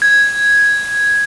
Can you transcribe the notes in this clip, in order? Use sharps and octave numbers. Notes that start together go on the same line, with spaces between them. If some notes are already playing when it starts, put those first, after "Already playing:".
G#6